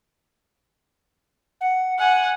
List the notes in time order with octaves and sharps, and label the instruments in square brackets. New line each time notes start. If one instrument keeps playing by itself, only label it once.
[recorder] F#5
[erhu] F#5 [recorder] G#5